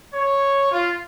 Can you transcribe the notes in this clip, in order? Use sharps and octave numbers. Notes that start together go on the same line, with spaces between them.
C#5
F4